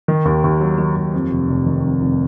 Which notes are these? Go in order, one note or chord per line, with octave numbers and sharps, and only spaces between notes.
D#3
D#2
D#2
F#3
D#3
D#2
F2
F1
F1
D#3
F2
F1